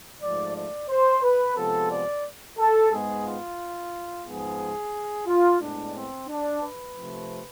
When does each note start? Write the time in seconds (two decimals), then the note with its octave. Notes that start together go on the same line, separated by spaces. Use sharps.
0.22 G#2 F3 A3 D5
0.56 D5
0.89 C5
1.23 B4
1.57 C3 F3 G#3 B3 A4
1.91 D5
2.58 A4
2.91 G#2 G#3 B3 G#4
3.25 F4
4.26 G#2 F3 B3 G#4
5.27 F4
5.60 A2 G#3 B3 D4
5.95 C4
6.28 D4
6.62 B4
6.95 C3 F3 A3 C4